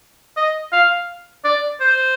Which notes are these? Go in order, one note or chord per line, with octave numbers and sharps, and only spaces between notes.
D#5
F5
D5
C5